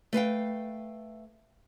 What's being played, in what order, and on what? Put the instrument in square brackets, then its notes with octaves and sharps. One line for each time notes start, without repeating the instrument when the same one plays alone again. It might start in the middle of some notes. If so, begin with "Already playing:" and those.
[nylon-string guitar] A3 B4 F5 G5